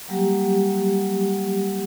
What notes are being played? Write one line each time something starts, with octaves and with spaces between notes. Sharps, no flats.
F#3 G3 A#3 G4 F#5